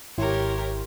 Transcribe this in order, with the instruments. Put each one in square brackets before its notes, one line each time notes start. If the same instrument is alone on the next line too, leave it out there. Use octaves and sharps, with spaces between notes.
[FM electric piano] G#1 E4 C6 [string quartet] G4 A#4 C#5